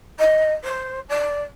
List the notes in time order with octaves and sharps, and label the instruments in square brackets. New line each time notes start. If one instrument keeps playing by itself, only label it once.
[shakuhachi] D#5
C5
D5